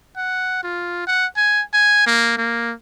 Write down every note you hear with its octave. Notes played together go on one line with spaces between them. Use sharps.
F#5
F4
F#5
G#5
G#5
A#3
A#3